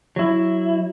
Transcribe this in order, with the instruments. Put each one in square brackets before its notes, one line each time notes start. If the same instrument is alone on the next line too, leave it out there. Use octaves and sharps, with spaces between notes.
[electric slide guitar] F#3 E4